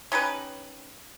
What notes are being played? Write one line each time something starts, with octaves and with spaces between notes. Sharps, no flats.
C#4 D#4 G4 B4